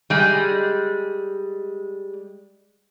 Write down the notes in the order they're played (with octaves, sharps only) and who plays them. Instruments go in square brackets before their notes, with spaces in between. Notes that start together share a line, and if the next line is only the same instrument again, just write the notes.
[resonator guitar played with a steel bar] G3 G#3